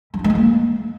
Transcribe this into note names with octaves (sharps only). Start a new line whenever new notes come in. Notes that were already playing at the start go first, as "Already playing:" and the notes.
G3
F4
G#3
C4
A#3